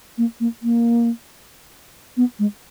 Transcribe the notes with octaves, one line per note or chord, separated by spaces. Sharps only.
A#3
A#3
A#3
B3
G#3